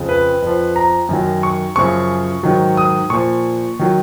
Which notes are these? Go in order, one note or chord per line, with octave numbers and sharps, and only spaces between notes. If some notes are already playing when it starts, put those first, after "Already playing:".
Already playing: F2 C#3 F3
B4
F2 F3
A#5
F#2 D#3 F#3
C#6
F#2 C#3 F3 C#6
G#2 D#3 F#3
D#6
A#2 F3 C#6
D#3 F#3